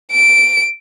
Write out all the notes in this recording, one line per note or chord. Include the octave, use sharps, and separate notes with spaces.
D7